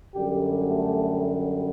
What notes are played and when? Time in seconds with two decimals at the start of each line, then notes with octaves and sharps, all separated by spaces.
0.14 F#2 D3 G3 G4
0.68 A3